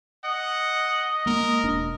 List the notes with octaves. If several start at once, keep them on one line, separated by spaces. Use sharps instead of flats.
D#5 F#5
G#3 A#3 A#4
E1 D4